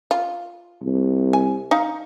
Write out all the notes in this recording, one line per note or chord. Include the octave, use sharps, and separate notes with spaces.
F4
C2
G#5
D#4 F5